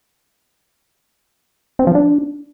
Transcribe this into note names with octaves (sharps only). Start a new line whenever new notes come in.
C4
F3
D4